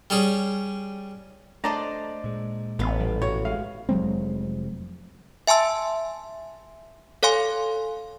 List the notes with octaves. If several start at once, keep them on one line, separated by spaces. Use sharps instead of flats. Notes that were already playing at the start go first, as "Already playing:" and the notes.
G3 C#4 G#4
A3 D4 C5 D5 D#5 A5 A#5
A#2 G#3
A1 B3 F5
A#2 F3 G3
G#2 B2 F#4 C#5
G#3 F5
F1 F#3 G#3 C4
E5 G#5 A5 C6 E6
A4 C#5 F5 G#5 C6